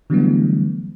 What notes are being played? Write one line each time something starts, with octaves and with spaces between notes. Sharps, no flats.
D3 E3 F#3 G3 A3 B3